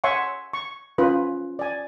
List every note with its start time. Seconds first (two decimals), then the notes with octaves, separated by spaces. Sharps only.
0.04 C#5 E5 F#5 G#5 C6 C#6
0.53 C#6
0.98 C#4 F4 B4
1.59 D5 G#5